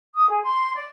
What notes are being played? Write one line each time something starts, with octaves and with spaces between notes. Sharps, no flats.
D#6
G#4
C6
D5